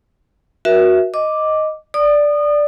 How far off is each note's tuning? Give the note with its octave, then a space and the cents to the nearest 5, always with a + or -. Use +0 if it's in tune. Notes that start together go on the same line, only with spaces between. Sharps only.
F#4 +0 A#4 +40 E5 +0
D#5 +0 D6 +0
D5 +0 D#6 -30